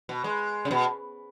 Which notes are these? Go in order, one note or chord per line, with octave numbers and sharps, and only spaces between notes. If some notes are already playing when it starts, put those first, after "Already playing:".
B2
G#3
C#3
B2